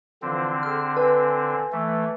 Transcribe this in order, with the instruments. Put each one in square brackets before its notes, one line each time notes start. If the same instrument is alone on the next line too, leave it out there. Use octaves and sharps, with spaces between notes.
[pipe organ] D3 C4 [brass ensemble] E3 F3
[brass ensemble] G#4 A4 [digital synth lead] F6
[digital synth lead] B4 [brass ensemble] G#5
[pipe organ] E3 A3